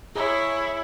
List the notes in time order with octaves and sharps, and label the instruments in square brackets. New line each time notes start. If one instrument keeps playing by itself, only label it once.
[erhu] E4 [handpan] G#4 [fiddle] C#5